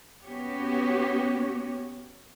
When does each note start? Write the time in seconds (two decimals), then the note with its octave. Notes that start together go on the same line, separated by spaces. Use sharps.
0.23 B3 C#4 F#4 G4 C#5